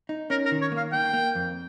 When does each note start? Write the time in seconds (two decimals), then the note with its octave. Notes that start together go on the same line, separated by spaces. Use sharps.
0.09 D#4
0.30 C#4 A#4
0.45 A#4
0.52 D#3
0.61 C#5
0.72 A#3
0.77 F5
0.92 A#3 G5
1.13 A#3
1.35 F2